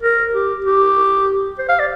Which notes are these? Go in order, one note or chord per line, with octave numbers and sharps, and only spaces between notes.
A#4
G4
G4
C5
F5
D5